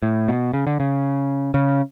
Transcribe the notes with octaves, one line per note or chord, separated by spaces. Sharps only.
A2
B2
C#3
D3
C#3
C#3